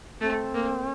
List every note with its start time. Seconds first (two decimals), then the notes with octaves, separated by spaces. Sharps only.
0.21 A3 C4
0.54 A#3